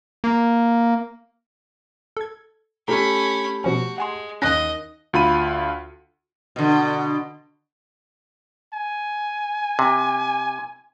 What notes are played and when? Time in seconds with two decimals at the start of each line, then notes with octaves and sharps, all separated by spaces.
0.24 A#3
2.17 A4 G#6
2.88 A3 C#4 G4 A4 A#5 B5 F6
3.64 B2 F3 C#4 F#4
3.98 G#3 F#5 G#5 C6
4.42 D#2 C#4 D#5 F#6 A#6
5.13 D2 F4 B5 D#7
6.56 B2 D3
8.74 G#5
9.79 C3